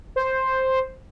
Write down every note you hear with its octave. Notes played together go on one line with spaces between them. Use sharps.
C5